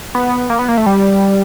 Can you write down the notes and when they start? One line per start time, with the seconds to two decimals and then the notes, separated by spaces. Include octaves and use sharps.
0.15 B3
0.50 A#3
0.59 B3
0.68 A#3
0.77 A3
0.86 G3